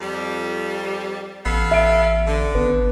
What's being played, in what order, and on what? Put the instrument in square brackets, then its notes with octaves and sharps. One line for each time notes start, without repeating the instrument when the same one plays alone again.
[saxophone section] F2 G3
[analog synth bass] A1 [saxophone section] B3 A4 F5
[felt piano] E5 D7
[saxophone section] D3
[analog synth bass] G#1 [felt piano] B3